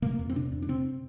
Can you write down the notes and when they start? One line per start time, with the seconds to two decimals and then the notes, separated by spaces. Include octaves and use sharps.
0.02 C3 A#3
0.19 F2
0.30 C4
0.36 C3 D4
0.52 F2
0.62 D4
0.68 C3 C4